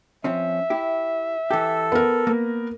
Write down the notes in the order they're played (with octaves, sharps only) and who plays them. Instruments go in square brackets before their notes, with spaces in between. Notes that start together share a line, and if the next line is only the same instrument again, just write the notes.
[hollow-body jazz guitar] F3 C4 C#4 [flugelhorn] E5
[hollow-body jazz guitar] E4 G4
[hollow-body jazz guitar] E3 G4 [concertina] A4
[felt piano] B3 A#4
[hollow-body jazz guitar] A#3